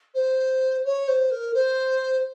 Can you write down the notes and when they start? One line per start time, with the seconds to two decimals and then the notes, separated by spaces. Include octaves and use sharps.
0.14 C5
0.85 C#5
1.07 C5
1.30 A#4
1.54 C5